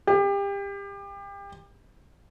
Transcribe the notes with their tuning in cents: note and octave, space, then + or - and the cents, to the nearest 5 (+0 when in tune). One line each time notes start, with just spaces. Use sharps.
G4 +30